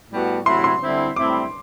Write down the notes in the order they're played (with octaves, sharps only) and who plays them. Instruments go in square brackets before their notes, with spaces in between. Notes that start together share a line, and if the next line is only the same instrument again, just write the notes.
[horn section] A2 G3 B3 F#4
[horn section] C3 F#3 A3 E4 [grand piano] C6
[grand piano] C6
[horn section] D3 G3 C4 E4
[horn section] A2 G3 C4 E4 [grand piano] D6